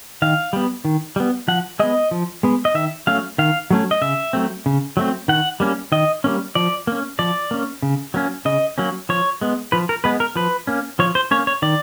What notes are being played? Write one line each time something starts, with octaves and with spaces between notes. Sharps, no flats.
D#3 F5
G3 B3
D#3
G3 B3
F3 F#5
G#3 B3 D#5
F3
G#3 B3
D#5
D#3 E5
F#3 A3 C#4 F5
D#3 F5
F#3 A3 C#4
D#5
C#3 E5
F#3 A3 C4
C#3
F#3 A3 C4
D#3 F#5
G3 A#3 C#4
D#3 D#5
G3 A#3 C#4
F3 D5
A#3 C#4
F3 D5
A#3 C#4
C#3
F#3 A#3 C#4
C#3 D#5
F#3 A#3 C#4
F3 C#5
G#3 B3
F3 B4
A#4
G#3 B3 B4
A#4
F3 B4
A#3 C#4
F3 C#5
C5
A#3 C#4 C#5
C#5
D#3 D5